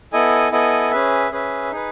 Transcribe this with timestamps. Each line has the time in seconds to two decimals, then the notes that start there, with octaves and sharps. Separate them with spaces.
0.12 B3 E4 A4 D#5 G#5
0.52 B3 E4 A4 D#5 G#5
0.91 C#4 G#4 B4 E5
1.31 C#4 G#4 B4 E5
1.71 D#4 G#4 B4